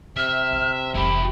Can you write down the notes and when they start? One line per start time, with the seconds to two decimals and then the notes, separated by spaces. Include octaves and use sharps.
0.17 C3 E5 F6
0.51 D3 E4
0.95 F1 E3 E4 G4 B5